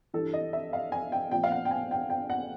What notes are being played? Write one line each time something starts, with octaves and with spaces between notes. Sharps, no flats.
G2 E3 A4
D#5
E5
F5
G#5
G5
A#2 F3 G5
F5
F#5
G5
G#5
G5
G5
F#5